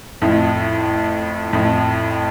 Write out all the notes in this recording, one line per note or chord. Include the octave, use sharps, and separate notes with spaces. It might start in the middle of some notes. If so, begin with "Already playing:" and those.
F2 A2
F2 A2